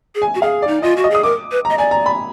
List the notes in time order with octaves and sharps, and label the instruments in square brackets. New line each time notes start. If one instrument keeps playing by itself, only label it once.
[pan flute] G#4
[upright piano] G#5
[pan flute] F#4
[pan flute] G#4 [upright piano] F5
[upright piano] D5
[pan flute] D#4
[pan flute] F4 [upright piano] D#5
[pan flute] F#4
[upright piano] D#5
[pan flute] G#4 [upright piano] D#6
[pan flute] A#4 [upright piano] D6
[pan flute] B4
[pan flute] D#5 [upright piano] A#5
[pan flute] D5 [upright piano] G#5
[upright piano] A#5
B5